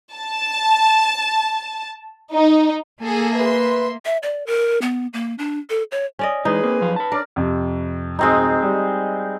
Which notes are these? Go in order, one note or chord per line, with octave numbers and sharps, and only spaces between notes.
A5
D#4
A#3 G#4 A4 G#5
B4 E5 C6
E5
D5
A#4
B3
A#3
D4
A4
C#5
C#4 D5 D#5
E3 G#3 D#4 G#4 B4
A#3 C4
F#2 F3 F5
B4 A5
C#4 D4 A#4 D5
F2 C3
D1 G#3 C4 D#4
G3